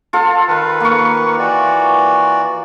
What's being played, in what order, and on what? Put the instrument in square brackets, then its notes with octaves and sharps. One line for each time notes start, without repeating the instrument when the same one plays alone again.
[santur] F4 A4
[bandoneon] D#3 B4
[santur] A#3 C#6
[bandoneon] E3 F#4 D5